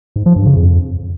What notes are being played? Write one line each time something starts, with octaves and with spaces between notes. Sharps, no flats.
G#2
F3
G2
C#3
F2